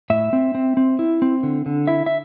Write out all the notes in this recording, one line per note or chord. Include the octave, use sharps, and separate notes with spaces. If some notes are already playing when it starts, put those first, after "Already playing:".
A2 E5
C4
C4
C4
E4
C4
D3
D3
E4 E5
E5